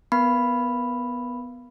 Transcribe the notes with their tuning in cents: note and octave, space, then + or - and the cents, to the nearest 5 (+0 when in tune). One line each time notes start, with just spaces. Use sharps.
B3 +0 A#4 +15 B5 +0